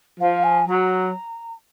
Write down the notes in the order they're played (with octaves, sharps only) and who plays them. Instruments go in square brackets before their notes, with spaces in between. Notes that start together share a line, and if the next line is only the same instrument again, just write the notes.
[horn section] F3 [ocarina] F5
[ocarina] G#5
[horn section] F#3 [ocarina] A#5